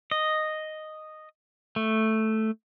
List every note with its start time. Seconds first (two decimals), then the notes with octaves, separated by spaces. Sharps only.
0.11 D#5
1.76 A3